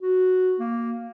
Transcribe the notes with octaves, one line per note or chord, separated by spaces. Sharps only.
F#4
A#3